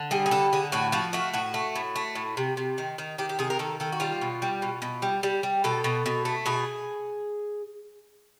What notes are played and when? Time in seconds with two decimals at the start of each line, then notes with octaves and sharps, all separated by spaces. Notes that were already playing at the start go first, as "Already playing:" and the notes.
Already playing: D3
0.11 G3 G#4
0.26 G#4
0.31 D3 A4
0.53 D3 G#4
0.72 A2 F#4
0.92 F3 F#4
1.13 A3 F#4
1.33 A2 F#4
1.54 A3
1.75 A2
1.96 A3
2.15 A2
2.37 C3
2.57 C3
2.78 D#3
2.98 D#3
3.18 D#3 G4
3.29 G4
3.39 C3 G#4
3.50 A#4
3.59 D#3 A4
3.80 D#3 A4
3.92 F#4
4.00 G3 F4
4.21 B2
4.42 G3
4.62 B2
4.82 B2
5.02 G3
5.23 G3
5.43 G3
5.64 B2 A4
5.84 B2
6.06 B2
6.25 A3
6.46 B2 G#4